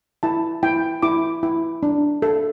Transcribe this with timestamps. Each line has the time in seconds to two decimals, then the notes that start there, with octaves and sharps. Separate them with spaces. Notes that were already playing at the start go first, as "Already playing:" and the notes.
0.23 E4 A5
0.63 E4 G5
1.03 E4 D6
1.43 E4
1.83 D4
2.22 A4